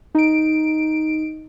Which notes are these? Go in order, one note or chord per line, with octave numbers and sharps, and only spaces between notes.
D#4 D7